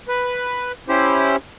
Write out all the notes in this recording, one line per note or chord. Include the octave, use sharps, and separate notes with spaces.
B4
C#4 E4 G4 C5